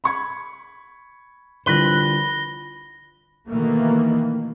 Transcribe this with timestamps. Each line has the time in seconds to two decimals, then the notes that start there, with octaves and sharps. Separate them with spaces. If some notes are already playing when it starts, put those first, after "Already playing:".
0.04 B5 C#6 G#6
1.66 C2 D3 F3 B4 A#6 G7
3.49 B2 D#3 E3 A3 A#3